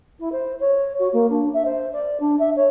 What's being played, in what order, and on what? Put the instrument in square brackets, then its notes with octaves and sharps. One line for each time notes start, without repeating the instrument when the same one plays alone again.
[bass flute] E4
C5
C#5
F#4
A#3
D4
E5
C5
D5
D4
E5
C#5